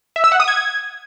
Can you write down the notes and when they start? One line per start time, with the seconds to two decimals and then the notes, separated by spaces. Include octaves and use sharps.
0.16 E5
0.24 E6
0.32 F#5
0.40 D#6
0.48 G#6